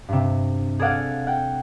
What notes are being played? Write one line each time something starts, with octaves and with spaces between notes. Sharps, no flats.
G2 C3
G#4 A4 D5 F5 F#5
F#5 G5